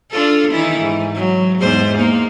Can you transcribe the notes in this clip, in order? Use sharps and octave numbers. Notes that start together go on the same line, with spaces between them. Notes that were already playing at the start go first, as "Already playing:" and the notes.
D4 F4 A4
D#3 E3 E4
G#2
F#3
E2 G#2 C5
A#3 D#4